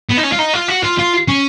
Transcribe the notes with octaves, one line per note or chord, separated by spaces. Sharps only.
B3
D#4
C#4
F4
D#4
F4
F#4
F4
F4
C#4